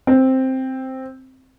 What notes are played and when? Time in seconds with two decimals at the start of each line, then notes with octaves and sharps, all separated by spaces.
0.07 C4